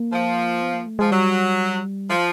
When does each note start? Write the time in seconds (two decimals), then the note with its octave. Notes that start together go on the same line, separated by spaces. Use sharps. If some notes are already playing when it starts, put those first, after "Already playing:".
Already playing: A#3
0.12 F3
0.62 B3
0.74 A#3
0.87 A3
0.99 F3 G#3
1.11 F#3 G3
2.09 F3